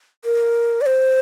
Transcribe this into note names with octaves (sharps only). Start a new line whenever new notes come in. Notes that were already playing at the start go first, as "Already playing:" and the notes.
A#4
D5
C5